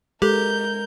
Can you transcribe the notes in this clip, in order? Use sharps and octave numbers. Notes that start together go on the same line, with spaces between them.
G#3 G4 A4 A#4 G6